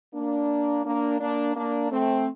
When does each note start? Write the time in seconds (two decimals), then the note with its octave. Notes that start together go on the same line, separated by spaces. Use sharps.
0.13 A#3 D4
0.84 A#3 D4
1.20 A#3 D4
1.55 A#3 D4
1.90 A3 C4